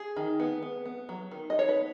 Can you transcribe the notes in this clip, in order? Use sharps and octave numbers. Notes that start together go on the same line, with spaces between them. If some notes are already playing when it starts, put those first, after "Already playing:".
Already playing: G#4
D#3
B3
B3
B3
F#3
D#3
D#5
D#4 C#5
B4
B3